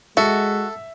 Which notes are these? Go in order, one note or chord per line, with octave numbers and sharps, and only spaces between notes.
G#3 F#4 A4 E5